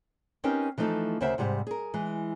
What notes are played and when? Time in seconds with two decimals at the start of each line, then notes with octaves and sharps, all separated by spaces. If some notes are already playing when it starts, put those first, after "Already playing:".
0.44 C4 C#4 D#4 G4 A#4 B4
0.78 E3 F3 A3 D#4 A4
1.20 D2 C#3 A#4 C5 E5 F#5
1.38 G#2 C3 G3 F#5
1.67 G#4 A#4
1.94 E3 G#3